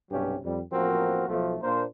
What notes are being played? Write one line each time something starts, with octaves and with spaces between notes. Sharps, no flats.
B1 G2 C3 F#3 C#4 G4
F2 G3
A1 F3 A#3 C4 F#4 A#4
B1 F3 A3
A#2 A#3 D4 A#4 C5